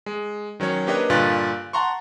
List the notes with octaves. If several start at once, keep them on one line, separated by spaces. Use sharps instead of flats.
G#3
D#3 F#3 C#4 C#5
A#3 D4 G4 B4 C#5 D#5
G2 A#2 D3 F4 F#6
F#5 A5 A#5 C6 C#6